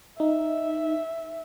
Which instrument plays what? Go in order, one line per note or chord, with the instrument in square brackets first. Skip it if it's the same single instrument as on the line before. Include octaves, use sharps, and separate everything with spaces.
[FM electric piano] D#4 [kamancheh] E5